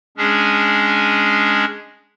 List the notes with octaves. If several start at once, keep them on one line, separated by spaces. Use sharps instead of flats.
G#3 C#4 D4 G#4